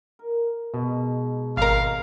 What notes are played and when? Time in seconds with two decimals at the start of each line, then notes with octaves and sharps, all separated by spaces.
0.19 A#4
0.74 G#2 B2
1.57 G#1 G#3 A#4 C5 C#5 F5